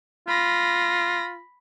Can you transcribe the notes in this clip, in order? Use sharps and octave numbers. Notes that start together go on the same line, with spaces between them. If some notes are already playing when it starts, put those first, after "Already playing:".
F4 B5 A#6